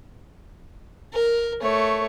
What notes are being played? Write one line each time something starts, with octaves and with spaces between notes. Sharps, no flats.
A#4
A3 C#5